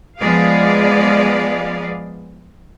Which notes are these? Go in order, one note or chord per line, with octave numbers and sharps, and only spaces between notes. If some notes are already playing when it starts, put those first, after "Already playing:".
F3 G#3 B3 G#4 D5 F5